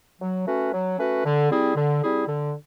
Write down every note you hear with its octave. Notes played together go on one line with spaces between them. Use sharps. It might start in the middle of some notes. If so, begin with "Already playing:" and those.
F#3
A3 C#4 F#4 B4
F#3
A3 C#4 F#4 B4
D3
G3 C4 E4 G#4
D3
G3 C4 E4 G#4
D3